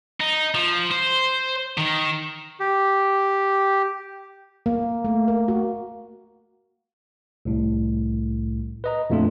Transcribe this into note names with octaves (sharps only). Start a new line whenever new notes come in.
D#4
F3
C5
D#3
G4
A#3
A3
A#4
F#4
C2 A2
B4 D#5 A#5
F2 A#2 A3 D4 F4